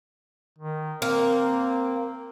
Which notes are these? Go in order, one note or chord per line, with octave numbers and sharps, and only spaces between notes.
D#3
A#3 C4